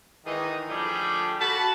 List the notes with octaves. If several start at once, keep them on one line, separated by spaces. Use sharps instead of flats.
G#2 D#3 E3 D#4 G#4 D#5
D3 F3 G3 A3 G4 G#4
F#4 A5 B5